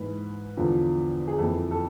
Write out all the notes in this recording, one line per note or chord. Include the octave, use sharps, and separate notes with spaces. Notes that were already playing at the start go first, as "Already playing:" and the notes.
Already playing: G#2 E3 B4
E2 D3 F3
G#4
F2 E3 A4
A4